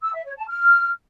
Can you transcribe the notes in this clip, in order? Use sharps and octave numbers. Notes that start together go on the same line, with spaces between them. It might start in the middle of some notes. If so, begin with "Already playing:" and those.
E6
E5
C#5
A5
F6